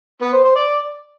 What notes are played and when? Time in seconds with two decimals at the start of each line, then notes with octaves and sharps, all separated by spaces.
0.21 B3
0.33 C5
0.44 C5
0.56 D5